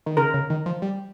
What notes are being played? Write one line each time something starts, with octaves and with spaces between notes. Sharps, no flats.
D#3
C#3 A#4
C#3
D#3
F3
G3